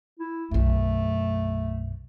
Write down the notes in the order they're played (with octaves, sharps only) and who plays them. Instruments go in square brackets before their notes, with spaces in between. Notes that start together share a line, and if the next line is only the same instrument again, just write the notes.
[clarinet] E4
[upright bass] B1 F#2 [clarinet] A3